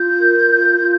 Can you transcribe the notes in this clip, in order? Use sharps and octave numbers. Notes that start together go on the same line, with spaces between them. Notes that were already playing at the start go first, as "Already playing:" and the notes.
Already playing: F4 G6
A#4
F4
F4